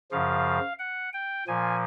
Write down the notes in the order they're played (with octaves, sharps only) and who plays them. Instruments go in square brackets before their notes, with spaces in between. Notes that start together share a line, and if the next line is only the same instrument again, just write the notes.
[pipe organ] F#2 C#3 F3 F5
F#5
G5
A#2 F3 G#5